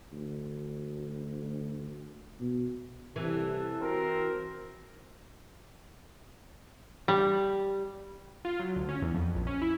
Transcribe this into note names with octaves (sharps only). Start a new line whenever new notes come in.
D2
B2
C2 C3 E3 A4
C4 F#4 A#4
G3
F4
F#3
D2
C#4
E2
F2
A#1
C#4
E4